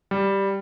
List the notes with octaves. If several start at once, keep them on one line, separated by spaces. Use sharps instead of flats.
G3